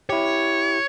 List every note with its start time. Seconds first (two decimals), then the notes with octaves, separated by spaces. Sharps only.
0.09 E4 G4 C#5